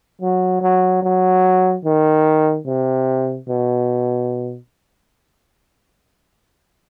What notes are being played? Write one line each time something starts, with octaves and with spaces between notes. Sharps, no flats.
F#3
F#3
F#3
D#3
C3
B2